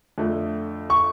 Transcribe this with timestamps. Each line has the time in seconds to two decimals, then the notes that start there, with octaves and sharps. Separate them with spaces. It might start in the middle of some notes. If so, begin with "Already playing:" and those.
0.18 F2 D3 A3
0.90 C#6